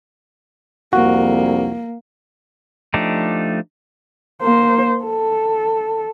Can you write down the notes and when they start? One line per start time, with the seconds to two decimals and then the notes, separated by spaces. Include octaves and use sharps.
0.93 C2 F2 A#3 F#4
2.94 F3 A3 D4 D#4 G4
4.42 A#3 C5
5.04 A4